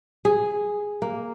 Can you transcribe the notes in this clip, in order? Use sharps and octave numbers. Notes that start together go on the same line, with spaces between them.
G#4
A#3